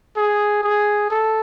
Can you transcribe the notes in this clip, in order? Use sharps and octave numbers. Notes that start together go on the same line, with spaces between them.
G#4
G#4
A4